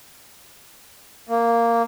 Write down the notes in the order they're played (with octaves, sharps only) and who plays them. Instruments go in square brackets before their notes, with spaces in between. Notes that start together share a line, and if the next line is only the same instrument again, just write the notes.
[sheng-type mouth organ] A#3